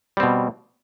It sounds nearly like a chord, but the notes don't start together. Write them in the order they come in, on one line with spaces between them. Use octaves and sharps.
G3 C4 B2